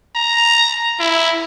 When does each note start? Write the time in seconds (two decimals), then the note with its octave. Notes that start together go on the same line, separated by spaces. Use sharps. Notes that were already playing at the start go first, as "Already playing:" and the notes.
0.16 A#5
0.99 E4